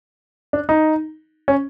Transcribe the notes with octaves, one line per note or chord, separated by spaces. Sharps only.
D4
D#4
C#4